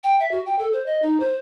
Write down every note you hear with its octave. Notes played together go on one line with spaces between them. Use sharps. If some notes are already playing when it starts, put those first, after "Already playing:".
G5
E5
F#4
G5
A4
C5
D#5
D#4
C5